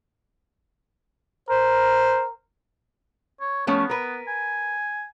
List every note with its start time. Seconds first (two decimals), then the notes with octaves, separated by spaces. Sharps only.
1.49 A#4 C5
3.41 C#5
3.67 F3 A3 B3 C#4
3.90 A#4 B4
4.28 G#5